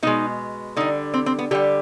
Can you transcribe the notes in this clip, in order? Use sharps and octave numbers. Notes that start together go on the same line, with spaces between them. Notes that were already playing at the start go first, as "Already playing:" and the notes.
B2 G#3 D#4
D3 G3 D#4
C4
C4
B3
D3 G3 G4